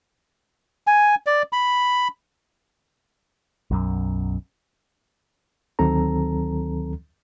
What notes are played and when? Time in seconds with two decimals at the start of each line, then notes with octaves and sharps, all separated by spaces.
0.87 G#5
1.26 D5
1.53 B5
3.71 B1 F#2
5.79 D2 D#3 F#3 C4 A4 A#5